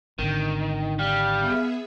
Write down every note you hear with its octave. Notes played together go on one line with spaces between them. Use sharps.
G#1 D3 D#3
G3 F5
B3 G#4 E5